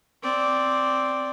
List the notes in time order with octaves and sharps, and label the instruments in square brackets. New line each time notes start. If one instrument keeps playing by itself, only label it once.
[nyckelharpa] C4 D5